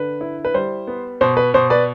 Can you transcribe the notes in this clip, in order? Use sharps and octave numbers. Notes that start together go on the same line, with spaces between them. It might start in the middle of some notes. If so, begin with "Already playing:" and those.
Already playing: D3 B4
E4
B4
G3 C5
B3
B2 C5
B4
B2 C5
B4 D5